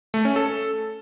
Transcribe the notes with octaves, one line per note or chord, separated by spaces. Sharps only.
A3
C#4
A4